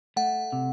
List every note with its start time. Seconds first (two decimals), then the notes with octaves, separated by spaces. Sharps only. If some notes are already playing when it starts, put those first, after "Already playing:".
0.16 A3 F#5
0.52 C3